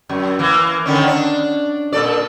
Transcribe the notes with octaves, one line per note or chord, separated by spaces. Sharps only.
F#2
E3 A#3
D3 D#3 C#4
D4
A#2 A4 D5